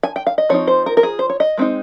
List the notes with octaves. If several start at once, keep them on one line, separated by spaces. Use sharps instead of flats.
G#5
G5
F5
D#5
F3 C4 D#4 C#5
C5
A#4
A#4
G#4
C5
C#5
D#5
G#3 C4 D#4